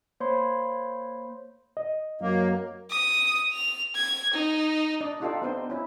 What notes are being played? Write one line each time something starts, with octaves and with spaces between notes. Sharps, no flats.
A#3 C5 C#5 B5 C6
D#5
F#2 F#3 A#3
D#6
F7
G#6
D#4
D4 D5 D#5
D4 D#4 F4 G4 A4 D5
B3 C4 D4 D#4 C5
C#4 E4